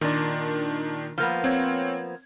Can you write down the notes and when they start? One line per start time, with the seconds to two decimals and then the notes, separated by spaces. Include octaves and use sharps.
0.01 A#2 D#3 D4
1.18 F3 A#3 B3
1.44 C4 C#5 G#6